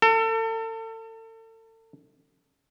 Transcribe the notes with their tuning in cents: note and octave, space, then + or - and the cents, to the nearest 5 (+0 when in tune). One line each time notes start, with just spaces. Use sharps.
A4 +35